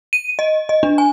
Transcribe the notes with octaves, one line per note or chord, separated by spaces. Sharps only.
D#7
D#5
D#5
D4
G#5